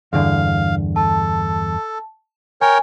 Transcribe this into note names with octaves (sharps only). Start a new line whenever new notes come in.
E2 G2 D3 F5
A4 A5
A#4 C#5 G5 G#5